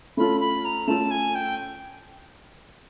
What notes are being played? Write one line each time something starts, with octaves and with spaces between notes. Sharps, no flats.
A3 C#4 F4 A4 B5
B5
A#5
A3 C#4 F4 A4 A5
G#5
G5